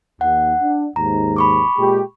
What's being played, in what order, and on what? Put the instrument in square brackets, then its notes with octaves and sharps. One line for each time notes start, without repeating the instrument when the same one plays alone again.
[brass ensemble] D#2 [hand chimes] F#5
[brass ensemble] D4
[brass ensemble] D#2 G#2 [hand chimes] A#5
[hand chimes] B5 C#6 D6
[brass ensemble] A#2 G#3 G4